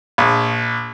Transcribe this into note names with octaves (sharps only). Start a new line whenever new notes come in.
A#1